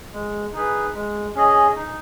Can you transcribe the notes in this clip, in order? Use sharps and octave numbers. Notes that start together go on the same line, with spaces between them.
G#3
D#4 G#4 B4
G#3
C#4 G#4 D#5
D#4